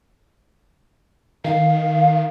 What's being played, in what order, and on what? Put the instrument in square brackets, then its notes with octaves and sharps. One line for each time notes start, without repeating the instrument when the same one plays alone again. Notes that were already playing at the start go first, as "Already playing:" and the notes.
[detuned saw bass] D#3 [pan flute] F5